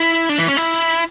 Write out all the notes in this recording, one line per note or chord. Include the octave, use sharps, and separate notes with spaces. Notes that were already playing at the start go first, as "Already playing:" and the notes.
Already playing: E4
D4
E3
C#4
E4